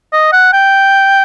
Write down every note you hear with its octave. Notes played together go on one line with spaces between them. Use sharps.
D#5
F#5
G5